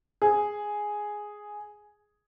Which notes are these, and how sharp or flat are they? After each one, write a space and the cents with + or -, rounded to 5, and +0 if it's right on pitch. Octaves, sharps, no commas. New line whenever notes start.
G#4 +0